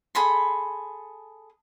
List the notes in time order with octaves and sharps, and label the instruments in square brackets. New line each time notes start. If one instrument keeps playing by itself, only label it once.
[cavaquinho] G#4 A4 B5 C6